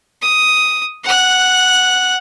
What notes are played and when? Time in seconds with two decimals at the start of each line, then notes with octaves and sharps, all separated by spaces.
0.22 D#6
1.05 F#5 F#6